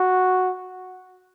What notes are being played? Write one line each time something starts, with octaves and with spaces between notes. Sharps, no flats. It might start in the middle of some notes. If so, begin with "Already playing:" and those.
Already playing: F#4